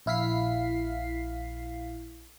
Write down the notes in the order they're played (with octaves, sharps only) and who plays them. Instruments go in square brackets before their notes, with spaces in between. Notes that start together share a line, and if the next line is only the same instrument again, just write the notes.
[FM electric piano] A#1 E4 F5 B6 C7